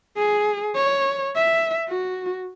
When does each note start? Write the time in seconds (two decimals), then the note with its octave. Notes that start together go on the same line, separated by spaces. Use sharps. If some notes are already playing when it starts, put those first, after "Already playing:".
0.16 G#4
0.75 C#5
1.35 E5
1.88 F#4